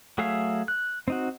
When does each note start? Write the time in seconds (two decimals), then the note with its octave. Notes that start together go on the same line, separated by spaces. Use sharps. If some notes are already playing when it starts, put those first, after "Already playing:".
0.18 F#3 A3 G#4 E5 F5
0.68 F#6
1.08 C4 D#4 F#4